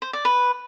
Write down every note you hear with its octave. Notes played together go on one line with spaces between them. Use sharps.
C5
D5
B4